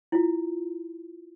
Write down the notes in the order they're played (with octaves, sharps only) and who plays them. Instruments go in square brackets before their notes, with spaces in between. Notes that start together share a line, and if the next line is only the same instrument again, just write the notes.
[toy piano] E4 F4